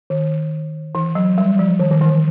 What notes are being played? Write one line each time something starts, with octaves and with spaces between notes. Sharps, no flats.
D#3
E3
F#3
G3
F3
D#3
D#3
E3